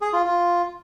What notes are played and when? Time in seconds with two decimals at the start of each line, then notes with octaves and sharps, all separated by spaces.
0.01 G#4
0.13 F4
0.25 F4